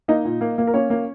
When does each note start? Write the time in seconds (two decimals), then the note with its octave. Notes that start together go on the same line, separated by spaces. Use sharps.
0.08 A#3 D#4 D#5
0.25 A#2
0.41 A#3
0.58 A#3
0.67 A#4
0.74 A#3 C#4 C#5
0.90 A#3